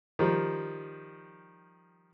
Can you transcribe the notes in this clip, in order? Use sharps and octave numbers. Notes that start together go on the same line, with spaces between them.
D#3 F3 G3